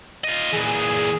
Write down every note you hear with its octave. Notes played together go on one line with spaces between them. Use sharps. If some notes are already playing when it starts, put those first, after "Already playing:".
F4 D#5
A#2 E3 G#4